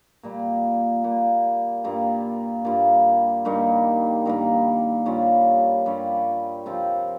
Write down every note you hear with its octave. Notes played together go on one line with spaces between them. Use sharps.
A#2 G3 A#3
A#2 G3 A#3
G2 G3 A#3 F4
G2 G3 A#3 F4
G2 D#3 G3 A#3
G2 D#3 G3 A#3
G2 G3 C#4 F4
G2 G3 C#4 F4
C3 F3 C4 F4